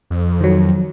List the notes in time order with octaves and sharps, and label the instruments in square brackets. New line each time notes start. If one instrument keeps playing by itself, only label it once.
[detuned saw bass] F2
[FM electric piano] D#3 F#3